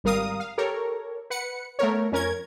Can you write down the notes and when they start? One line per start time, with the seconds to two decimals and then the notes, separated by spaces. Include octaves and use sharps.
0.04 G#1 G3 A#4 F5 D#6
0.40 F5
0.58 G4 A4 A#4 C#5
1.30 B4 F#5 C#7
1.79 A3 B3 A#4 C#5
2.12 F2 C#4 A#4 G#6